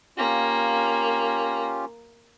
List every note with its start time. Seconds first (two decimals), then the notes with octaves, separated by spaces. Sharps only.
0.18 A#3 C#4 F4 G4